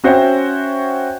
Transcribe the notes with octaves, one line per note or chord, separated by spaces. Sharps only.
C#4 F#4 C5 C#5 E5 G5